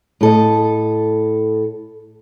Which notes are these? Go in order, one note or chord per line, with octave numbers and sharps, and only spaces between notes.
A2 A4 D#5